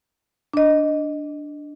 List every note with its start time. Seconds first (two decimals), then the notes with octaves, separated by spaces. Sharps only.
0.53 D4 D#5